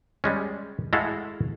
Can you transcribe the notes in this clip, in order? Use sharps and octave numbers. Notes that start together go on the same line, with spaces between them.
G3 G#3 C#4
G#3 A3 E4 F#4 A4 F5